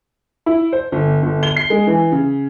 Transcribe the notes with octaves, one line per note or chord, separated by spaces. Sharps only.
E4
C5
G1
G1
G7
C7
G#3
E3
C#3